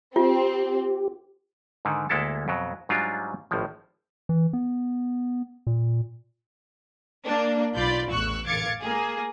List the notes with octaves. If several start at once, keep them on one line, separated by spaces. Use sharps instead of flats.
C4 F4 G4
G#2 D3 D#3
D2 G#3 A#3 E4 A4 A5
F2 B2 F#3
G#2 F#3 G3 D4 F4
G#1 A2 F3
E3
B3
A#2
A#3 D4
B1 F4 D5 B5 G6
A1 E2 C#6 E6 F#6
F5 D6 G#6 A6 C#7
A#3 G#4